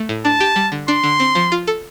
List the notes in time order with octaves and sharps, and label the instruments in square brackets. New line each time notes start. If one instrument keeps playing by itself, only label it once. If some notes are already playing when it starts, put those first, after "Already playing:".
Already playing: [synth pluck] A3
A2
[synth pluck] D4 [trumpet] A5
[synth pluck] G4
G3
D3
[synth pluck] D4 [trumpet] C6
[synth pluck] D3
C4
F3
F4
A4